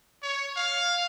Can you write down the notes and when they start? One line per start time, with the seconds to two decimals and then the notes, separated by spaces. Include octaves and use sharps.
0.23 C#5
0.56 F5